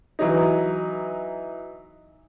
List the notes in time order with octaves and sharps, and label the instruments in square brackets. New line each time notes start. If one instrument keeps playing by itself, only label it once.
[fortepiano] E3 F#3 D#4